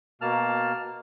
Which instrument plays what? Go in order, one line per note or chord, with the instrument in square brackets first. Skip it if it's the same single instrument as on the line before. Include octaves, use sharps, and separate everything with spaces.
[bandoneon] B2 A#3 A5 F6